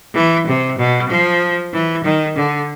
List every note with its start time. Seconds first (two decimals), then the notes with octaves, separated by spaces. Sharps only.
0.15 E3
0.47 C3
0.79 B2
1.09 F3
1.74 E3
2.04 D#3
2.37 D3